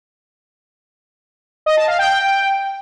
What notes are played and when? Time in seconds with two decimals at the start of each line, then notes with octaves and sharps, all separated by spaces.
1.66 D#5
1.77 A5
1.88 F5
1.99 G5